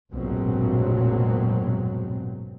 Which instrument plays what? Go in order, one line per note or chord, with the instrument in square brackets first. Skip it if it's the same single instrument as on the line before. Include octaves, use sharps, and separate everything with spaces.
[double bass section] F1 A#1 G#2 B2 F#3 C4